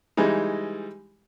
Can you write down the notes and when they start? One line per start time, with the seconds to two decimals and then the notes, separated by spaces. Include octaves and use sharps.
0.17 E3 G3 G#3 D#4